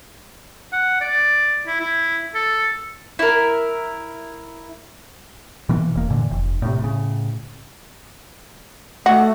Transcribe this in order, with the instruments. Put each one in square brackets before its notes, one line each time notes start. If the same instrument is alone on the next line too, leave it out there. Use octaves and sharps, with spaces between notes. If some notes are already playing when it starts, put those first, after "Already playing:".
[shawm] F#5
D5
E4
E4
A4
[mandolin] E4 A#4
[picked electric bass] B2 E3 A#3
E1 A#3
F#2 A#2 D3 E3
F1
A2 C3
A2 C#3
[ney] A3 [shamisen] F#4